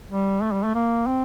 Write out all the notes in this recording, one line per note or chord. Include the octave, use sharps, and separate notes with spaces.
G3
A3
G3
A3
A#3
C4